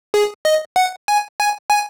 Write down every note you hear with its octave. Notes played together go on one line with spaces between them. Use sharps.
G#4
D#5
F#5
G#5
G#5
G#5